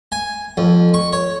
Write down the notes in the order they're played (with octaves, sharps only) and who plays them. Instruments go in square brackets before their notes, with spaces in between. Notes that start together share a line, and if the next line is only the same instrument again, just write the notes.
[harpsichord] G#5
F2
C#6
C#5